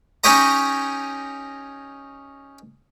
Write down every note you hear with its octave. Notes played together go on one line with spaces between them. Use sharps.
C#4 D#4 G4 C#5 D#5 A#5